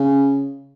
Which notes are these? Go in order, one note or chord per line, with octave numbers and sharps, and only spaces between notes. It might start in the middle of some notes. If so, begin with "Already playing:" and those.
Already playing: C#3